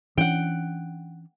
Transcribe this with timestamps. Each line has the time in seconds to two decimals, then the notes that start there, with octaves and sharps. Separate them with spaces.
0.18 E3 C#4 D4 F#5 G5